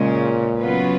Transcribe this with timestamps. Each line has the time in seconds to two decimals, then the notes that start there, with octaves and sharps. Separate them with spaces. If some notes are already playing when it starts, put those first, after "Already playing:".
Already playing: A#2 C#3 G#3 C#4
0.60 C#3 F#3 B3 F4 B4